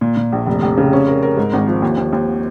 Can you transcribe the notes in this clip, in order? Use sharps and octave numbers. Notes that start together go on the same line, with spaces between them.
A#2
A#2
A#1
F1
F1
C#3
C#4
A#4
A#4
G#2
G#1
F3
D#2
D#2
D#2